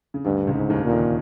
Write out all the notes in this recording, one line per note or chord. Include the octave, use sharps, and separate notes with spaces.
C#3
D2 G2 D3
D3
C#2 C#3
G#2
D#2 D#3
A#2
D#2 D#3